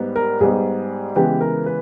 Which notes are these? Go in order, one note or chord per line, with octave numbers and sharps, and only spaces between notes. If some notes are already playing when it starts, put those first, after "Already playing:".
Already playing: G#2 G3 B3
A#4
G#2 G3 B3 G#4
C#3 E3 G#3 B3 G4
A#4
B4